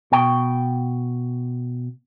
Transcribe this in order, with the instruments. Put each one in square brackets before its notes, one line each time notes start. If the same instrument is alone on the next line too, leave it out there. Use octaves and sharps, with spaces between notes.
[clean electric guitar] B2 G5